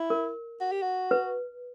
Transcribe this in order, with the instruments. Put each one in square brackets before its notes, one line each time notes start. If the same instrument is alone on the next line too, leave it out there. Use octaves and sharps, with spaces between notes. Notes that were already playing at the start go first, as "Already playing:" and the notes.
Already playing: [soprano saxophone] E4
[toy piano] A#4
[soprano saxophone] F#4
G4
F#4
[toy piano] B4